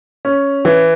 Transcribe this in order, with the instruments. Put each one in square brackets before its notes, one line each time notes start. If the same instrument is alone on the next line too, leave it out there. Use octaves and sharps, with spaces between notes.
[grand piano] C#4
E3